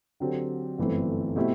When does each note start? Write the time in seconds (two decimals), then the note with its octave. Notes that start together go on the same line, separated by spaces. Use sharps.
0.20 D3 F#3 C4 G4
0.78 G1 F#2 E3 A3 C4
1.36 B2 A3 C4 E4 G4